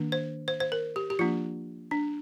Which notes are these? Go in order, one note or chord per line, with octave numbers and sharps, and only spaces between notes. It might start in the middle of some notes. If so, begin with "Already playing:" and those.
Already playing: D#3 A#3 D4
C5
C5
C5
A#4
G4
G4
F3 A#3 D4 F4
D4